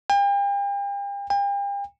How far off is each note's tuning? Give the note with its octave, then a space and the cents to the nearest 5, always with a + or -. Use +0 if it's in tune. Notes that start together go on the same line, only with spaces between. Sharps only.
G5 +40
G5 +40